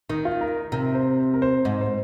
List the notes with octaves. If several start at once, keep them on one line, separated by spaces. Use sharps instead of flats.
D#3 D#4
F4
A#4
C3 A#4
C5
A#4
C5
G#2 D#5
C5